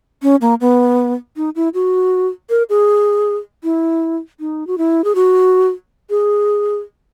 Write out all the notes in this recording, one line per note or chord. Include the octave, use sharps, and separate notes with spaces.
C#4
A#3
B3
D#4
E4
F#4
A#4
G#4
E4
D#4
F#4
E4
G#4
F#4
G#4